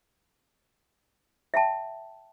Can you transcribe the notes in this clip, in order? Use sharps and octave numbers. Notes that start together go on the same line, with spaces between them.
E5 F5 G5 A5